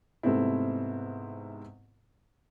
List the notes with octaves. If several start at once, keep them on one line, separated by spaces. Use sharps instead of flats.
G#2 C3 A3 B3 C4 E4